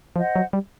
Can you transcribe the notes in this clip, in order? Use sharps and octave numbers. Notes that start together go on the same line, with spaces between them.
F3 C5 D#5 F#5
F#3
G3